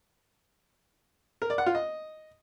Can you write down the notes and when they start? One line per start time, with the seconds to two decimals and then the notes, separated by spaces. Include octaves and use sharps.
1.42 A#4
1.50 D5
1.58 F#5
1.66 F4
1.75 D#5